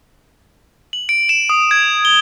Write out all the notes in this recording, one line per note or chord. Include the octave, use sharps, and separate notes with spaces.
F#7
D7
E7
D#6
G#6
G7